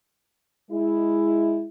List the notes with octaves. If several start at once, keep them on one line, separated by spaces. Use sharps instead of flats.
G#3 E4